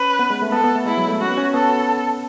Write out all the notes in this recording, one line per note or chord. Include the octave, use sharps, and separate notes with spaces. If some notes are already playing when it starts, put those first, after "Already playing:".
Already playing: C#4 B4
B3
G#3
A3
B3 A4
B3
A3
G#3 E4
F#3
A3
C#4 F#4
B3
C#4
B3 A4